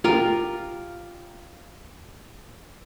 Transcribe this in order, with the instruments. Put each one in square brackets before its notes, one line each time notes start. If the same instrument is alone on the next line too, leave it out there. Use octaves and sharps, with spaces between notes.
[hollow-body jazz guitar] F4 G4 A#4